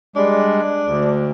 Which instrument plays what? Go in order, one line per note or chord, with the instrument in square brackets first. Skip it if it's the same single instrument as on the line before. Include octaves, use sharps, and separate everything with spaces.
[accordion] G3 G#3 [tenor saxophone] D4
[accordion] D2